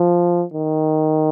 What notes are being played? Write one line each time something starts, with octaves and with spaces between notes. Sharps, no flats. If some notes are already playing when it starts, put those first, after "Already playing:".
Already playing: F3
D#3